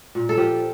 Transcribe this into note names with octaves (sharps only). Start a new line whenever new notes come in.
A#2
A4
F3 G4